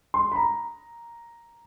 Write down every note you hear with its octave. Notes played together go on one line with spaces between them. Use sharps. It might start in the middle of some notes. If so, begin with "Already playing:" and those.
C6
B5
A#5